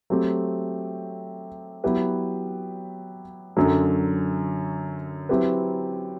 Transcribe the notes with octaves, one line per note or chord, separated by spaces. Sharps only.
F#3 A3 C4 G4
F#3 B3 E4 G4 B4
F#2 D3 F#3
F#3 C4 E4 G4 B4